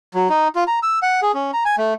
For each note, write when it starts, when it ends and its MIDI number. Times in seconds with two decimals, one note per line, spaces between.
0.14 0.28 54
0.29 0.48 63
0.55 0.64 65
0.68 0.79 82
0.83 0.99 88
1.02 1.20 78
1.22 1.32 68
1.34 1.51 61
1.54 1.64 82
1.65 1.76 80
1.78 1.94 57